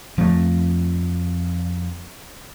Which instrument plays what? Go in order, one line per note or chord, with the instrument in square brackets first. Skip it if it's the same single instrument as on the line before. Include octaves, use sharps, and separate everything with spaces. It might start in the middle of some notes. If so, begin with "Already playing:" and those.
[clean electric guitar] F2 [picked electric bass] F3 A3